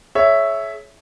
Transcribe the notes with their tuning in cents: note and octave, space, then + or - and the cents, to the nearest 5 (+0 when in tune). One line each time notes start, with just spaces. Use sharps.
G#4 +40 C#5 +0 E5 +0